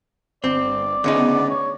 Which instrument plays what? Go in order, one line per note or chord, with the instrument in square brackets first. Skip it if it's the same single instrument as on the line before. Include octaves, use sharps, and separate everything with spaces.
[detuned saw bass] G1 [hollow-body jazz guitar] C4 [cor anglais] D5
[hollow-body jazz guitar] D2 C#3 D#4 [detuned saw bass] B3
[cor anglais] C#5